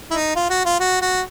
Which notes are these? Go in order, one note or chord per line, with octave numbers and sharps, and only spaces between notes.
E4
D#4
F4
F#4
F4
F#4
F#4